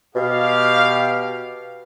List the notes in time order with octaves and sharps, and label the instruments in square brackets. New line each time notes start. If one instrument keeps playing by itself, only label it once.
[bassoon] B2 [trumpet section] G4 F5